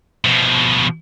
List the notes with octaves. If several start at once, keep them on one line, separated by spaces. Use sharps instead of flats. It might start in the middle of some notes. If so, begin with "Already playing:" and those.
B2 F3